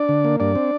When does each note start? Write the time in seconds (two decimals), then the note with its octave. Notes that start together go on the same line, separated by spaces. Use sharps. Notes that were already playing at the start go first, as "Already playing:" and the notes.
Already playing: D4 D5
0.09 D3
0.25 A#3
0.40 G2 D4 D5
0.55 C4